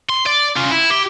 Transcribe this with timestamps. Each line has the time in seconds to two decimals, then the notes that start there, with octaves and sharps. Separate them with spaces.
0.09 C6
0.26 D5
0.56 C#4 F4
0.71 E4
0.91 G4